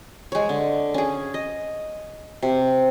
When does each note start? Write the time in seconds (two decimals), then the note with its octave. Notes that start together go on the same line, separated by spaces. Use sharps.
0.32 G#3 C#5
0.49 D3
0.94 C#4 G#4
1.34 D#5
2.42 C3